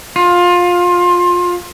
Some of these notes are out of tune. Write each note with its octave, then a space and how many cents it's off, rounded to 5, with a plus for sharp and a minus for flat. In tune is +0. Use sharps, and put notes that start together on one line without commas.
F4 +20